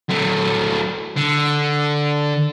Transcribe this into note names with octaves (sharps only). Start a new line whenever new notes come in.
F#3 A3
D3